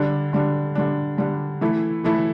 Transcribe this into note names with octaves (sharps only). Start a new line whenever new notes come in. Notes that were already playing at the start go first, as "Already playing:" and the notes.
Already playing: D3 G3 D4
D3 G3 D4
D3 G3 D4
D3 G3 D4
E3 A3 E4
E3 A3 E4